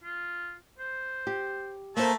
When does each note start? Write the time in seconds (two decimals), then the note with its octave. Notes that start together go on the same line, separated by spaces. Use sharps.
0.04 F4
0.79 C5
1.27 G4
1.96 A3 A#3 C5 E5 A5 A#5